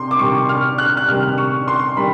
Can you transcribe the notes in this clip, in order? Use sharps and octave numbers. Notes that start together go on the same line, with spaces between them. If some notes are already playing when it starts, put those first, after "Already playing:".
Already playing: C3 C6
D6
C3 D#3 G3 C#6
F6
F#6
F#6
C3 D#3 G3 F6
C#6
C6
D#3 G3 B5